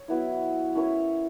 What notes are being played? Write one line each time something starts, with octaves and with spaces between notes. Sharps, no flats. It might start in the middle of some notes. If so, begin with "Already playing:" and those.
Already playing: C#5
F#3 B3 E4
C#4 E4 A#4 C#5